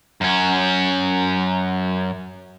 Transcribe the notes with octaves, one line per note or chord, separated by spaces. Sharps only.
F#2 C#4